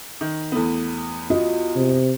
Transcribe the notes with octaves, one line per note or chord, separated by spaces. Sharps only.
D#3
E2 A3 B3
F4 F#4 D#5
C3